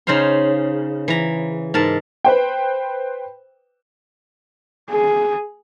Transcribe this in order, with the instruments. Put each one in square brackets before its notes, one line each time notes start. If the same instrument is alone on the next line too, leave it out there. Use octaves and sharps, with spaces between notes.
[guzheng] C#3 D#4 C5 F5 C6
E3 A#5
G#2 A#4 A5
[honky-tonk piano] B4 C5 G5
[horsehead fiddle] G#4